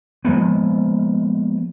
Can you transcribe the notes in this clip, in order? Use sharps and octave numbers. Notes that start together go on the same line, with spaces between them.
F3 G#3 A#3 B3